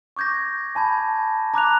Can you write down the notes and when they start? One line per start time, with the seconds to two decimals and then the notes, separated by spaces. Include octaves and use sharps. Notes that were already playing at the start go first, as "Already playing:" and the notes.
0.16 C#6 D6 G6 G#6 A#6
0.75 G#5 A5 B5 G#6
1.54 A#5 D6 F#6 F7